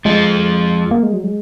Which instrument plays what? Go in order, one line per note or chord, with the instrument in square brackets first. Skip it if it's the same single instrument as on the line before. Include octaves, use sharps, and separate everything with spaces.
[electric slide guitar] F2 F3 [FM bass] G#3
[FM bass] A#3
G#3
F#3
G#3